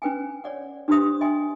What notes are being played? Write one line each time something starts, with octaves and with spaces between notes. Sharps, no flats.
C#4 B4 G5 G#5
C#5 D5 F#5
D4 G4 B4 C5 C6 D#6
D#5 E5 G5 G#5 C6